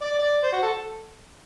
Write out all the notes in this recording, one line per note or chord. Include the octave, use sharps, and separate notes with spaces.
D5
D5
C5
F#4
A4